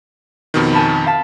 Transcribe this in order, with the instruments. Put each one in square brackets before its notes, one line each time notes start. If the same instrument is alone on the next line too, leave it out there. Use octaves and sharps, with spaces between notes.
[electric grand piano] F2 B2 D#3
[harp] G#5 A5 B5
F5 A5 B6